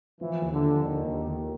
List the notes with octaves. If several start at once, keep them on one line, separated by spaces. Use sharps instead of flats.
E3 F3
D#2
D3
F3
D#2 D#3
D#2
D#2